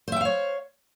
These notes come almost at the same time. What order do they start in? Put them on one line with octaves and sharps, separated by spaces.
C5 E5 G5 F5 C#5